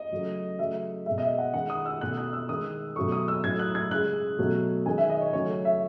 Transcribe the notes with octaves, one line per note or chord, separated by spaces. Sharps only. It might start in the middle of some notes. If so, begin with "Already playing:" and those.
Already playing: D#5
C#3 F#3 A3
C#3 F#3 A3 E5
B2 G#3 E5
D#5
E5
F#5
D#3 G#3 F#5
D#6
E6
B2 A3 F#6
F#6
E6
D#3 G#3 D#6
B2 F#3 A3 C#6
D#6
E6
A2 F#3 A3 G#6
F#6
G#6
C#3 G#3 F#6
B2 F#3 A3
D#3 G#3 G#5
E5
D#5
C#5
C#3 F#3 A3 C#5
E5